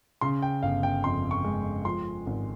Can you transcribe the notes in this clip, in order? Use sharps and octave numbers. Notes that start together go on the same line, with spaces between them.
C#3 C6
G5
G1 F5
G5
F2 C6
C#6
G#3
F3 C6
G#1